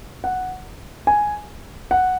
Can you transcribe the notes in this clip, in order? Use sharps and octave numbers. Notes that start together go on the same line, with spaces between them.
F#5
G#5
F#5